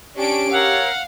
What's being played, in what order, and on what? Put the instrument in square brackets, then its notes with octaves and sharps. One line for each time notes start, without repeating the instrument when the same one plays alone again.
[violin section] C#4 D4 D7 [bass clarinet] G4
[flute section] A#4 C#5 E6 [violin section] F5 [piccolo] F#5